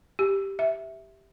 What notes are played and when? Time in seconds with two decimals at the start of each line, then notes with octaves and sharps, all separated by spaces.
0.19 G4
0.59 E5